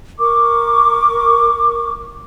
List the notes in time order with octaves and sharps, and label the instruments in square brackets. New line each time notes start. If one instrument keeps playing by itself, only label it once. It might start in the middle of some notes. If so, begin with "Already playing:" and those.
[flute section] A#4 C#6 D6